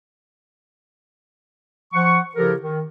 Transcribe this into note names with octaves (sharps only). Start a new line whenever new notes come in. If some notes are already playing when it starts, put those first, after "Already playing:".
F3 F#5 C#6
C#3 F3 E4 G4 A4 A#4
D#3